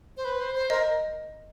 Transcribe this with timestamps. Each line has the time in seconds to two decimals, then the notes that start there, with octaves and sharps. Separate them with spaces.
0.17 C5
0.25 B4
0.40 C5
0.55 C5
0.69 A#4 D#5